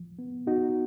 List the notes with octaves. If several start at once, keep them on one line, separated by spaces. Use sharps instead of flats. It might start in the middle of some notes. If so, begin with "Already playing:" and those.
Already playing: F3
B3
B3 D#4 F#4